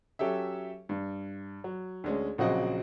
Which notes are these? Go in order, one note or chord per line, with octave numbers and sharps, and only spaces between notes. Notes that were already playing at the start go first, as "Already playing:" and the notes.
F#3 C#4 G4 A4 E5
G2
F#3
D2 G#3 C#4
A#1 C#3 F#3 C4 F#4 D#5